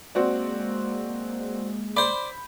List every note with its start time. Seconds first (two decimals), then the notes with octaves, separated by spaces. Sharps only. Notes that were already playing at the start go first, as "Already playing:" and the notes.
0.15 G#3 A#3 C4 F#4 D5
1.97 C5 D5 B5 G6